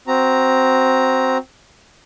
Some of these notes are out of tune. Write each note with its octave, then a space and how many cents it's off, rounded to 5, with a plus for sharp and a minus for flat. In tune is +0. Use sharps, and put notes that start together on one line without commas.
C4 +0 F#4 +0 A#5 +0